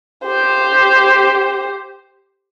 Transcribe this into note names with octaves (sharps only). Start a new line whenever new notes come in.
G4 C5